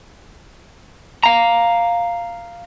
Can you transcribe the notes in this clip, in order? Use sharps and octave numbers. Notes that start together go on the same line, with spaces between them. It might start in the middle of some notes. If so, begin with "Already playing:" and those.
F5 A#5